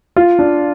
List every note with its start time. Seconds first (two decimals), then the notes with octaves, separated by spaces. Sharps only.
0.16 F4
0.39 D4